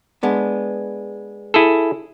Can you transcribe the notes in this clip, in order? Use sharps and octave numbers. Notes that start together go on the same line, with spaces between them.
G#3 B3 D4
E4 G#4 A4